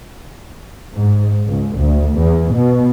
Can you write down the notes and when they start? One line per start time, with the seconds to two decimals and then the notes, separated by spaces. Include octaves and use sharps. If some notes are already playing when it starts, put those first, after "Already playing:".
0.95 G#2
1.49 C#2
1.79 D2
2.19 E2
2.54 B2